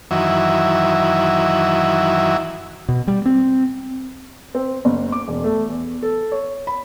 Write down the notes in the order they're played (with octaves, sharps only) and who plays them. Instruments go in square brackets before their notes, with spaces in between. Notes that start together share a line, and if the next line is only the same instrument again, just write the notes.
[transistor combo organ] F#2 D#3 E3 F#3 E4
[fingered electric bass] B2
G3
C4
[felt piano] C4
F#1
D6
E1
A3
E2
A4
C#5
B5